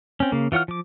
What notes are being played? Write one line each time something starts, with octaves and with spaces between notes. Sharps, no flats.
C4 C#4
C#3 A#3
E3 F4 C#5 F#5 F6
F3 D6